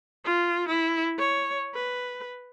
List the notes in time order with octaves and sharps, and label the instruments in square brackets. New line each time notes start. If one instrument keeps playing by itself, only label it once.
[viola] F4
E4
C#5
B4